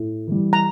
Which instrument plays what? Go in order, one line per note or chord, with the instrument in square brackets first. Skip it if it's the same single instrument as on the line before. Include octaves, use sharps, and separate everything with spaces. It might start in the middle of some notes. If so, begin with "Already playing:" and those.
Already playing: [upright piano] A2
E3 G3
[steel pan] A#5